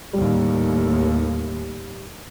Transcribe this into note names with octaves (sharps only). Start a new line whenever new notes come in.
D#2 A2 G3